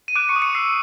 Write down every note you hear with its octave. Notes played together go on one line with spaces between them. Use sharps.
D#7
D6 F#6 D7
C#6 C#7
D#6
C#6 C#7
E6 C7